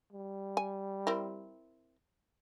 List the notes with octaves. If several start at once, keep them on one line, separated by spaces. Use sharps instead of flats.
G3
G#5
C4 E4 A#4